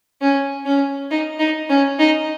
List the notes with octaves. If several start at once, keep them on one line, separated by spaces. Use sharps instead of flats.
C#4
C#4
D#4
D#4
C#4
D#4